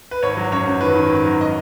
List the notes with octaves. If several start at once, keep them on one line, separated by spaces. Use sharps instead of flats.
B4
G#1 C#5
F#3
F#2 C#5
F#2
D#3 B4
D#3
G#1
F#3
D#5